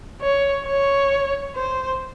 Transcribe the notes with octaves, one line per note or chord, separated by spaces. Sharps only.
C#5
C#5
C5